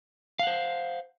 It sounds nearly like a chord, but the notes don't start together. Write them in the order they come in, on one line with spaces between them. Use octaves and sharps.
F5 F#5 C5